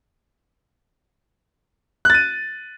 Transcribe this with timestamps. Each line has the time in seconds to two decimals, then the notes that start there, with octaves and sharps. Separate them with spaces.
2.05 F#6
2.10 A6
2.14 D#7